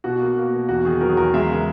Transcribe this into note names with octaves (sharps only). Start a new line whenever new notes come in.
B2 F#4
A#3
A#3
B2
E2 F#4
D#3 G#4
F#3 A#4
G#4
E2 A#4
G#3 E5
C#3